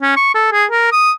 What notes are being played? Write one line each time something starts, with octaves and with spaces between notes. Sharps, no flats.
C#4
C#6
A4
G#4
A#4
D#6